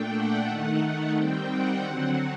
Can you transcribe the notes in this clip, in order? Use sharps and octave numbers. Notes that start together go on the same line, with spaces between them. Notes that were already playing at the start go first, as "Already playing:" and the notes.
Already playing: A#2 A3 D4 G5
F#5
D#3 A3 D#4
D#3 G3 C4 G5
F#5
D3 F#3 C4